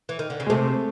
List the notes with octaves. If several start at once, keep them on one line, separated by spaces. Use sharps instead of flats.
E3
D#3
D3
C#3
G#3
C3 A3